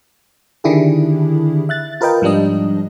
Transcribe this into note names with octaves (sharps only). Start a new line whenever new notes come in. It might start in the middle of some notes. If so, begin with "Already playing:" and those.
D3 D#3 D4 E4 G4 G#4
E5 F#6 A6
F4 A#4 B4 D#5 G5
G#2 F3 G3 D4 D#5